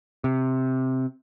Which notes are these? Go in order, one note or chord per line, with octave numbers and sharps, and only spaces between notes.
C3